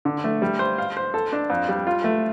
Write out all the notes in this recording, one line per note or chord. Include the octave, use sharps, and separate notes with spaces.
D3
A3
G3
C5
F5
C5
A4
D4
F2
G3
F4
A3